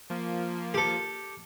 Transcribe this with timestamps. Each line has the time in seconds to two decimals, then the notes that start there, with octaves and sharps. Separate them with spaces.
0.10 F3 A#3
0.74 G4 A4